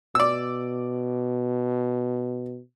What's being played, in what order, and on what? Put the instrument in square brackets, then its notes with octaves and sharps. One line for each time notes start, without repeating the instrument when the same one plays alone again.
[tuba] B2 [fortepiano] D5 E6